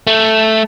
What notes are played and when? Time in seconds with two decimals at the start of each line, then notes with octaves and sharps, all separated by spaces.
0.07 A3